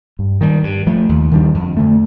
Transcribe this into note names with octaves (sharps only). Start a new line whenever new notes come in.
G2
D#3 G3
G2
F3 A3
D#2
D#3 G3 D4
F2
D3 A3